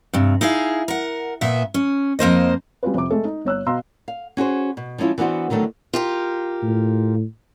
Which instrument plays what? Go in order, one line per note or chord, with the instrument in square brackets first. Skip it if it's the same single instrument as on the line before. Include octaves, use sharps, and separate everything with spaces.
[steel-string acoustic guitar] G2 C3
D#4 E4 G#4 F5
A#4 F#5
A#2 B3 E5
C#4
F2 A#3 C5 D#5
[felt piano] G3 C4 C#4 F4 B4
F2 C3 D6
G#3 A3 A4
D#4
G1 C#5 E6 F#6
B2 F5 A#5 C6 E6
[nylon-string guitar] F5
C#4 F#4 G#4 C5
B2
F3 G#3 C#4 E4 F4
E3 B3 D4 F#4 C5
D3 D#3 F#3 A3 B3
[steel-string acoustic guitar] F4 G4 A#4
[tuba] A2